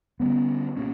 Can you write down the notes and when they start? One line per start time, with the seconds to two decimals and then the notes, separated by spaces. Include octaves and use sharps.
0.20 D3 G3 B3 C#4
0.77 A#2 A#3 C#4